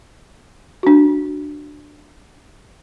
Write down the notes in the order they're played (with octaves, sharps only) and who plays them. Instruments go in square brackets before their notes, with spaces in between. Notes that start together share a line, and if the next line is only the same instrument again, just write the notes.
[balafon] D4 F#4